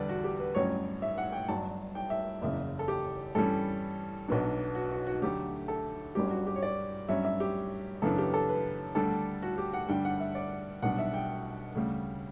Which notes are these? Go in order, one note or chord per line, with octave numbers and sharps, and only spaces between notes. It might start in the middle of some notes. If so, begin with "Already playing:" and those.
Already playing: E2 D3 G3 B3 D4 B4 D5
F#4
G4
B4
A1 G2 F#3 C#4 C#5
E5
F#5
G5
G1 G2 F#3 A5
G5
E5
F#1 E2 C#3 E5
A4
G4
G2 E3 G3 C#4 A4
B1 B2 F#3 B3 D4
F#4
F#4
F#4
D2 D3 F#3 A3 G4
A4
G1 G2 F#3 C#4 G4
F#4
G4
C#5
D5
G2 F#3 C#4 E5
E5
G4
F#2 C#3 E3 B3 D4 A4
G4
A4
B4
D2 D3 G3 D4 A4
F#4
G4
F#5
G2 D3 G3 D4 G5
F#5
E5
D5
B1 B2 G3 D4 F#5
E5
G5
D2 C#3 G3